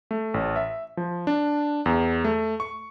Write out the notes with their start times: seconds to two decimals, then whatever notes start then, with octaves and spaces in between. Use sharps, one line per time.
0.11 A3
0.34 A1
0.56 E5
0.97 F3
1.27 D4
1.86 E2
2.24 A3
2.60 C#6